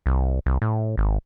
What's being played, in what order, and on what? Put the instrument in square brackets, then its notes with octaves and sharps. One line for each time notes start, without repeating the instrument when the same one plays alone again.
[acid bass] C2
C2
A2
G#1